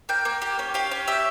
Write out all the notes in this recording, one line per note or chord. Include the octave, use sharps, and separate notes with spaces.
A#3 G5
A#3
G4
C#4
G4 F5
C#4
G4 E5